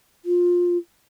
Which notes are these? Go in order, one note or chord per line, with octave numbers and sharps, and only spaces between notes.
F4